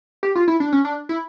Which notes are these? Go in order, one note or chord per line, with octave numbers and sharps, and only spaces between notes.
G4
F4
E4
D4
C#4
D4
E4